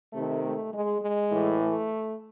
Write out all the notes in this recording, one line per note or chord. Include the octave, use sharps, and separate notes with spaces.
C3 D#3 A3
A3
G#3
G#3
A2 E3
A3